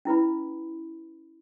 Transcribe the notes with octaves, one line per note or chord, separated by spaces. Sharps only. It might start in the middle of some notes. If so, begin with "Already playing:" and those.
C#4 E4 B4 B5